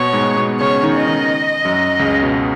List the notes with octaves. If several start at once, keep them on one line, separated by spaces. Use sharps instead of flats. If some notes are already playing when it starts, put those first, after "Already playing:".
Already playing: B2 B3 C#5
G#2 G#3
B2 B3
C#3 C#4 C#5
D#3 D#4
D#5
D#3 D#4
F#2 F#3
C#2 C#3
B2